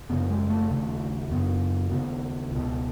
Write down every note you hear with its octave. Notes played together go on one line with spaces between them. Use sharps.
F#2 C#3 B3
G#3
A3
D#2 C#3 A3
F#2 C#3 B3
D#2 C#3 B3
C#2 B2